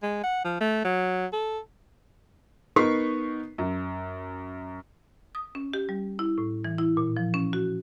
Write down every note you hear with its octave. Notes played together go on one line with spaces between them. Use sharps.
G#3
F#5
F3
A3
F#3
A4
B3 D#4 A#4 C#6 B6 C7
F#2
D#6
C#4
G4
G3
E4
A2
E3
E4
A#2
F3
C#4
F#4